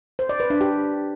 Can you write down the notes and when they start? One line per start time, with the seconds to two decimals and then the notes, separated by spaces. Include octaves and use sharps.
0.19 C5
0.29 D5
0.40 B4
0.50 D4
0.61 G4